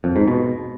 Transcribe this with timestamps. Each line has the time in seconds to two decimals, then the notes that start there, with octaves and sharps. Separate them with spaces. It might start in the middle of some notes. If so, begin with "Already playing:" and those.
0.04 F2
0.16 G#2
0.27 B2